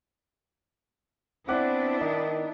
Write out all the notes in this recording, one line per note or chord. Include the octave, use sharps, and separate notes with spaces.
B3 C4 D4 E4 F#5 D6 F#6
D#3 D#4